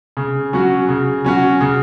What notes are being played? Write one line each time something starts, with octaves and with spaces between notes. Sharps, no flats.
C#3
F#3 C#4 F#4
C#3
F#3 C#4 F#4
C#3